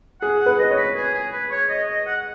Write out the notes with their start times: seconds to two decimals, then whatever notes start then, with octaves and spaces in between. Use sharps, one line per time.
0.21 G#4 F#5
0.40 F#5
0.46 B4
0.59 D#5
0.71 C#5
0.77 B4
0.96 G#4
1.14 G#4
1.33 B4
1.51 C#5
1.70 D#5
1.88 D#5
2.06 F#5